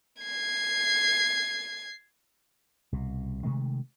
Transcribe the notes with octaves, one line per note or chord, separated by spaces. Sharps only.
G#6 C7
C2 B2
C3 D#3 G#3 A3